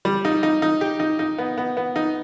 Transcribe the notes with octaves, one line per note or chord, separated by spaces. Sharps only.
G3
D#4
D#4
D#4
G4
D#4
D#4
B3
B3
B3
D#4